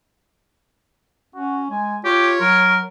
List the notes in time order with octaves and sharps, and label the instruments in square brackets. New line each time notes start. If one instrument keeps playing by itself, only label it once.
[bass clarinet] C#4 [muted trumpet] F#4
[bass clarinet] G#3 [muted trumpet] G#5
[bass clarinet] F4 [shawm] G4 [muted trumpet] C#5
[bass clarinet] F#3 [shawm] A#4